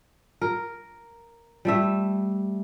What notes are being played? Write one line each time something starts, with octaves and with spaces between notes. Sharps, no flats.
A#4
G3 A3 E5